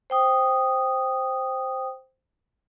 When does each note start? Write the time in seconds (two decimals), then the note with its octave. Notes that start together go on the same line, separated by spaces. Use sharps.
0.10 C5 G5 D#6